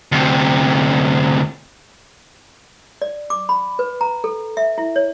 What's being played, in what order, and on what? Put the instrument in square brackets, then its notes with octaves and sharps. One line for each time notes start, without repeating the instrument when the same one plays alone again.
[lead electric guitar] D2 C3
[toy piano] D5
D6
B5
B4
A#5
A4
E5
E4
C#5